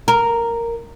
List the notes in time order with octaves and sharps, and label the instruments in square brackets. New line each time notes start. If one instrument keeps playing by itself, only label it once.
[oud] A#4